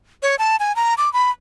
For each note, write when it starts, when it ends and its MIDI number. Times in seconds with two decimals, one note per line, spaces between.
0.23 0.36 73
0.39 0.56 81
0.60 0.75 80
0.76 0.94 82
0.98 1.11 86
1.13 1.31 83